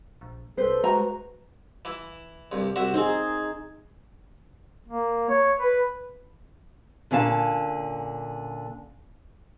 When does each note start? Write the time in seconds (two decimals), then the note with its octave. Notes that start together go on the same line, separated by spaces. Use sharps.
0.21 A#1
0.57 C2 A4 B4 C5
0.84 G#3 F#4 A#5
1.85 E3 E4
2.52 C2 G2
2.76 C2 F#4 E5
2.94 C4 D#4 G#4 C5
4.88 A#3
5.29 C#5
5.59 B4
7.11 A#2 D3 C#4 F5 A5